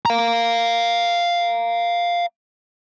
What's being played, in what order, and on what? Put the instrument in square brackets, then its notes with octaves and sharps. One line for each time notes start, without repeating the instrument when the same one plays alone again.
[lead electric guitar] F5 A#5